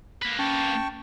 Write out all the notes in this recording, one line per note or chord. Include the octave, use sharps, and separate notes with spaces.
A#3 B4 B6
C#4 G5 A5 C#6